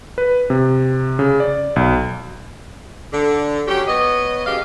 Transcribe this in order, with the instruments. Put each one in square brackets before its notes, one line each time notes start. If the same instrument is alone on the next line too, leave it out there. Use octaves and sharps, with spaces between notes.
[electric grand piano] B4
C3
C#3
D5
B1
[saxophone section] D3
F#3 C#4 G4
B3 C#5 D#5
F#2 B2 G#3 G4 F5